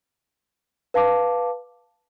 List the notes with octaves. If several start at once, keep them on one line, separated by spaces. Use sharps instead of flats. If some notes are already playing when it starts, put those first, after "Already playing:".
B4 F5 A5 D6